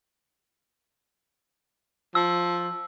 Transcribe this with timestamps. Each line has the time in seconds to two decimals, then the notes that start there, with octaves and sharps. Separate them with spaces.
2.15 F3 E6